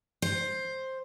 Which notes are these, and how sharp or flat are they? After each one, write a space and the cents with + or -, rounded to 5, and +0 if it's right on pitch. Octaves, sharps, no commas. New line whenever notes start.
C5 +10